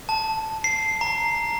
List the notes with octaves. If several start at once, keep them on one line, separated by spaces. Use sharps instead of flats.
A5
C7
A#5